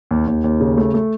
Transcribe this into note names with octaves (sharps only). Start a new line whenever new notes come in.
D#2
D#2
D#2
C#3
A3
A3